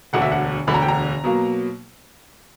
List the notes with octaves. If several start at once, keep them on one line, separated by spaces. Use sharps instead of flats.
E1 D2 D3 F#5
E5
F#5
E1 D2 D3 B5
A#5
G5
A#5
B2 F#3 A#3